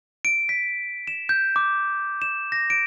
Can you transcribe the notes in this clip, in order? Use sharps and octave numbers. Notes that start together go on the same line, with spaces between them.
D7
B6
E7
G6
D6
E7
A#6
D7